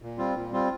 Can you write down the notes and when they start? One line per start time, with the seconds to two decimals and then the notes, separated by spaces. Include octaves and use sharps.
0.02 A#2
0.18 G3 C4 F4
0.35 A#2
0.52 G3 C4 F4